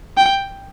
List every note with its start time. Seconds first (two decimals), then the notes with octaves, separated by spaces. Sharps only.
0.17 G5